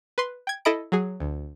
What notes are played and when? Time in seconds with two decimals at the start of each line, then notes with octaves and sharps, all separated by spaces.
0.18 B4 C6
0.47 G5 G#6
0.65 E4 A4 D#5 B5 D7
0.92 F#3 G#4
1.20 D2